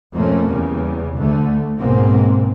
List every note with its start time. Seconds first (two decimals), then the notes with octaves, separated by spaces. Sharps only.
0.14 F2 B2 A3 A#3 C#4
0.49 E2 C#3 G3
1.17 D2 D3 A3
1.78 B1 G#2 B2 A#3 C4